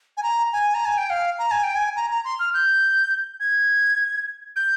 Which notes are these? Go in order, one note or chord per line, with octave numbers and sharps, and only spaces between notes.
G#5
A#5
G#5
A#5
G#5
G5
F5
A#5
G#5
G5
G#5
A#5
A#5
C6
F6
G6
G#6
G6